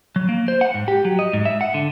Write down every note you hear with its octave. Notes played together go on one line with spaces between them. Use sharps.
F#3
A#3
C5
F#5
G#2
G4
F#3
D#5
G#2
E5
F#5
D3